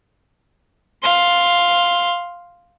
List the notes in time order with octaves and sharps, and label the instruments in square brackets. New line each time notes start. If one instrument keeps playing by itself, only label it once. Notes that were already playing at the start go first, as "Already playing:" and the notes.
[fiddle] F5 C6